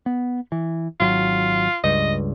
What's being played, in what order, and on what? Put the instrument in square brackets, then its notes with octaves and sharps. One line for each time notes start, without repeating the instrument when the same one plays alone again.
[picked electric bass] B3
E3
[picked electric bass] G#1 F#3 [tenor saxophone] F4
[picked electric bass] C#2 G2 [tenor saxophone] D#5